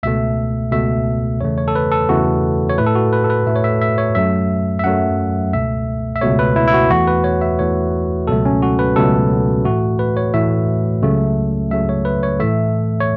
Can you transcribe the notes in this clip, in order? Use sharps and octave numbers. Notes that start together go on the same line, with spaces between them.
C#2 B2 A3 E5
C#2 B2 A3 E5
E2 C#3 E3 A3 C#5
C#5
A4
B4
A4
E2 C#3 E3 A3 F#4
C#5
A2 A3 B4
A4
F#4
B4
A4
B4
A2 A3 E5
C#5
E5
E5
C#5
F#2 F#3 A3 E5
E5
F#2 F#3 A3 F#5
C#2 B2 A3 E5
E5
C#2 B2 A3 C#5
B4
E4
E4
F#4
E2 E3 A3 F#4
B4
C#5
E5
E2 E3 A3 C#5
C#2 B2 F#3 A3 A4
C#4
F#4
B4
C#2 B2 F#3 A3 A4
A2 E3 A3 F#4
B4
C#5
A2 E3 A3 E5
C#2 C#3 F#3 A3
C#2 C#3 F#3 A3 E5
C#5
B4
C#5
A2 E3 A3 E5
C#5